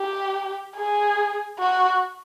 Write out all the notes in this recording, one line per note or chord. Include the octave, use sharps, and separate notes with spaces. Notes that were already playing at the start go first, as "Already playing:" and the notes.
Already playing: G4
G#4
F#4